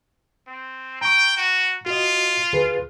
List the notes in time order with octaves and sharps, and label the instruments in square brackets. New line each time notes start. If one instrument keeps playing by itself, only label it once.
[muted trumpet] C4
[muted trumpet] G5 [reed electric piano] A#5 C#6
[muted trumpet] F#4
[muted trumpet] F4 [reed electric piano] F#4 D#5
[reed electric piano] D2 G#4 B4